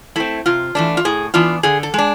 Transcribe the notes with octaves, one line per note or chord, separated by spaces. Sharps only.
A3 C4 E4
C3 F4
E3 A3 D4
F4
A2 G#4
E3 B3 D4 F4
D3 G#4
A4
G#3 D4